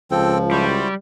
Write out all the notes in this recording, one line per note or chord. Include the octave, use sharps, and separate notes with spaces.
C#2 F3 C4 A4 G5
G3 E4 F#4 C5